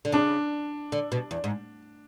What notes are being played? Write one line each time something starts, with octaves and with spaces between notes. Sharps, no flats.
D3
C#3 D4
D3
B2
E2
G#2